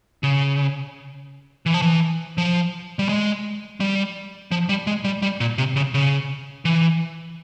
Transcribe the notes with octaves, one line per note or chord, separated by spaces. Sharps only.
C#3
E3
F3
E3
F3
G3
G#3
G3
F3
G3
G#3
G3
G3
A#2
C3
C#3
C#3
E3